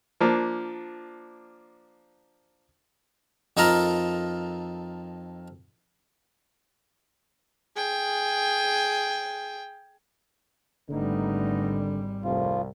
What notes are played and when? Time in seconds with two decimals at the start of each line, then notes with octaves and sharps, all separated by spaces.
0.20 F3 A#3 D4
3.57 F2 D#4 F4 A4 A#4 A#5
7.76 G#4 G5
10.90 G#1 D3 G3 A3 B3 D#4
12.24 F1 C2 F3 F4